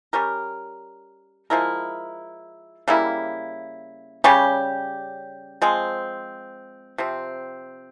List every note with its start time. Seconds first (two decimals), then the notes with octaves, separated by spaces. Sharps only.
0.13 G3 C#4 G4 A#4
1.50 F3 G#3 E4 A#4
2.88 C#3 G3 A#3 E4
4.24 C#3 G3 C#4 G4
5.62 F3 G#3 C4
6.98 C3 F3 C4